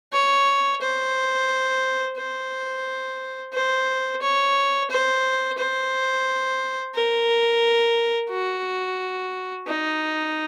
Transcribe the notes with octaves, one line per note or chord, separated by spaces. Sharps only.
C#5
C5
C5
C5
C#5
C5
C5
A#4
F#4
D#4